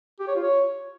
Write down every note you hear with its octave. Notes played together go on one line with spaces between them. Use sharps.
G4
C#5
F4
C#5